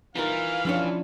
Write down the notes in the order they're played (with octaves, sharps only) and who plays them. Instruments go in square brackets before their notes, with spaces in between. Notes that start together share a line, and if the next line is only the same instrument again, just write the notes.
[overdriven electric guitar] E3 [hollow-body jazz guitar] D#4 F4 A#4 [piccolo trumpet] F5
[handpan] F3 C#4 D4 [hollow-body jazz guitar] E4 F4 C#5